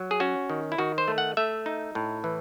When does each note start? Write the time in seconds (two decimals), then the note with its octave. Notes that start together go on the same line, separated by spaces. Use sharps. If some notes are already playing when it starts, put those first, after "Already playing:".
Already playing: F#3
0.11 G#4
0.20 C#4 F#4
0.50 D#3
0.72 E4
0.78 D#3 F#4
0.98 C5
1.08 A3
1.18 F#5
1.37 A3 E5
1.66 D#4
1.95 A2
2.24 E3